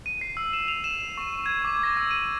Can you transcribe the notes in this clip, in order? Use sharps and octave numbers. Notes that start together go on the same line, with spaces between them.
D#7
C7
E6
E7
F7
E7
C#6
G#6
D6
A#6
E6
D#7